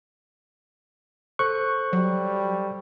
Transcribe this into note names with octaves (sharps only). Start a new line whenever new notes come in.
A4 C5 C#6 F#6
F#3 G3